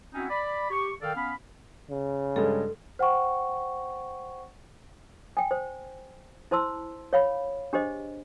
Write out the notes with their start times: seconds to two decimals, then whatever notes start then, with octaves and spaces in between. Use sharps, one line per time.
0.14 C4 C#4 D#4 E4 F#4
0.30 D5 B5
0.71 G4 C#6
1.02 D#3 A4 D5 F5 G5
1.15 B3 C#4 F5 B5
1.89 C#3
2.36 G2 G#3 A4
2.99 C5 F#5 G5 C#6
5.37 G5 G#5
5.51 C5
6.51 E4 C5 A5 C6 E6
7.13 C#5 F5 B5
7.73 D4 G4 G#4 C5 D#5